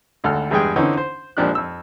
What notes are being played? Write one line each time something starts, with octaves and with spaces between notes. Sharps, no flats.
G#1 D2 A4 F6
E2 G2 G#3 G#4 G5
D3 E3 C4 C#4 D#4
C5
G#1 A#2 F3 D4 G4 F#6
F2 E6